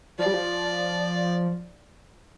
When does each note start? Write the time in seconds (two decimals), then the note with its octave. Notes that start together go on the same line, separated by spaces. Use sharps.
0.19 F3 D5
0.26 G3
0.33 F3